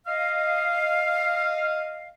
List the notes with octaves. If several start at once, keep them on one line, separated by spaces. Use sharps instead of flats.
D#5 F5